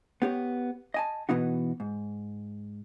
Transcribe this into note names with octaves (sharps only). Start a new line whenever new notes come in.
B3 G4 C#5
D#5 G#5 A5
B2 E3 B3 D#4 F#4
G#2